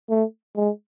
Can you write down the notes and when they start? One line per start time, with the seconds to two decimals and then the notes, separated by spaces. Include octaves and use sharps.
0.10 A3
0.56 G#3